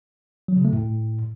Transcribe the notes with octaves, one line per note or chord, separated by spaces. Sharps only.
F#3
C#3
A3
A2